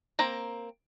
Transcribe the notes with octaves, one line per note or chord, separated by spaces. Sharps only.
A#3 C4 A#5